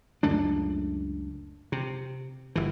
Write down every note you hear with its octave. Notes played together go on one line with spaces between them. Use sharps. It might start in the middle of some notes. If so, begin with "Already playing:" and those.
C#2 F#2 A3 D4
C3
G1 E3